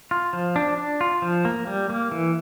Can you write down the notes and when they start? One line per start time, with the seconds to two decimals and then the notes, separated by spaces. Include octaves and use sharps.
0.11 F4
0.33 F3
0.56 D4
0.78 D4
1.01 F4
1.22 F3
1.45 A#3
1.67 G3
1.90 A#3
2.11 E3